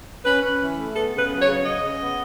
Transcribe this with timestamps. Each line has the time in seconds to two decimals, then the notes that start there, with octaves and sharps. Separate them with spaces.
0.24 C#4 B4
0.42 C#4
0.60 E3
0.77 A3
0.95 B3 A4
1.13 C#3
1.18 B4
1.30 F#3
1.42 C#5
1.48 C#3
1.65 C#3 D#5
1.83 C#3
2.01 B3